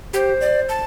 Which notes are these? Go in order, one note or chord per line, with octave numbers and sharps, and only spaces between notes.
G4 C5
D5
A5